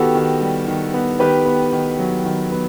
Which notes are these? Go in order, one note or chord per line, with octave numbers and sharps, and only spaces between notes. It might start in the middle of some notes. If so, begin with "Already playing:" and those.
Already playing: D#3 B3 F#4 G4 A4
D#3
G3
D#3
B3
D#3 G4 B4
B3
D#3
F#3
D#3
B3